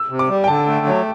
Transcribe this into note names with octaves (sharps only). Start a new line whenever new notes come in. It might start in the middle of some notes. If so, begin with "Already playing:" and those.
Already playing: E6
C3
D6
G3
G5
D3 A5
A3
F#3